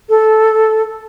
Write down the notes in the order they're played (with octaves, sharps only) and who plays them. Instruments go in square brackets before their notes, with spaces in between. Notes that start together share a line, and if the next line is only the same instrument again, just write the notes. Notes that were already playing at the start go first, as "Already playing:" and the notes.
[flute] A4